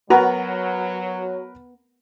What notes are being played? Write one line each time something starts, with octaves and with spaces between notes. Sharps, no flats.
F#3 B3 F#4 A#4 B4 A#5